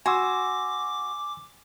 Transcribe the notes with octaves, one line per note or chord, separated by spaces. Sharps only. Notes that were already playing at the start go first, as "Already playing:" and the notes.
F#4 G#5 C6 D6 E6